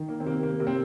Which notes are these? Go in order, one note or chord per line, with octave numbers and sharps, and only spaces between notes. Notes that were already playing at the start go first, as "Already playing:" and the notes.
Already playing: D#3
A#3
C4
C3 A#3
A#3
C3 A#3
C4